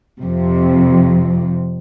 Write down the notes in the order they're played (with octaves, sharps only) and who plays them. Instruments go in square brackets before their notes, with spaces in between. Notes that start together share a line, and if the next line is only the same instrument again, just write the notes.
[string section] F2 C3